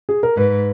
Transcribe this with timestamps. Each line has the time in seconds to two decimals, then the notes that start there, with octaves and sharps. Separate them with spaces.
0.09 G#4
0.23 A#4
0.37 G#2 B4